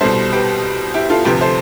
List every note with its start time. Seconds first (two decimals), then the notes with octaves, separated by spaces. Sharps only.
0.01 C2 B2 G3 A4 C5
0.32 G4 B4
0.94 E4 G4
1.10 F4 A4
1.25 D2 C3 F3 G4 B4
1.41 A4 C5